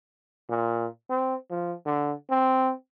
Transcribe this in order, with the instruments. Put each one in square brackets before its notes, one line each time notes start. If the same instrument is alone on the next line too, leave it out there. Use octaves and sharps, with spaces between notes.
[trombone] A#2
C4
F3
D3
C4